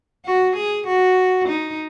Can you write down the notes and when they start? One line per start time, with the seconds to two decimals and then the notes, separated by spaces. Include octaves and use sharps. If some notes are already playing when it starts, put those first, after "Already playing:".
0.25 F#4
0.56 G#4
0.86 F#4
1.48 D#4